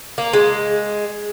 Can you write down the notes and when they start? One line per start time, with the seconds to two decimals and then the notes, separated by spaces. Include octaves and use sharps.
0.18 A#3
0.33 G#3